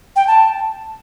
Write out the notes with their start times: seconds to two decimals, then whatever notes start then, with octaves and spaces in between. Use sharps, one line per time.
0.16 G5
0.28 A5